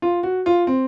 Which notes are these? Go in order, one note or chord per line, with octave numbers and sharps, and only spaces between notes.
F4
F#4
F4
C4